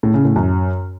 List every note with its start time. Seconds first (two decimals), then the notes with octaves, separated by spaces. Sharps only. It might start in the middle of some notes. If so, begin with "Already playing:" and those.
0.03 A2
0.14 C#3
0.25 A2
0.36 F#2